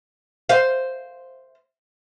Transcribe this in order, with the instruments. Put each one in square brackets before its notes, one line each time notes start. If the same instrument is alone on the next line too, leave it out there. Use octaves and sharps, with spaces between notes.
[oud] C5 F5